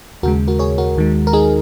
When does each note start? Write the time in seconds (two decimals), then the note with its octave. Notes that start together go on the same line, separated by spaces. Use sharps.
0.23 D#2 C#3 G#3 F#4 A#4
0.48 F#4 A#4
0.59 G#4 C#5
0.78 F#4 A#4
0.97 D#2 D#3 G#3
1.27 A#4
1.33 D#4 G#4